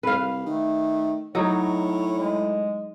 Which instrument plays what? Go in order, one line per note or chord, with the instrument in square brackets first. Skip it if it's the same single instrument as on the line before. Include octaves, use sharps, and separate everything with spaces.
[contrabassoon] C2 [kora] B4 F5
[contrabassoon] D#3 [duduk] A3
[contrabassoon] A2 [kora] F#3 D#4 [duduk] C#5
[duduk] G#3